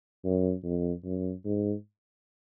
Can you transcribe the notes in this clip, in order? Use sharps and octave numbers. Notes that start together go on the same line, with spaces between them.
F#2
F2
F#2
G#2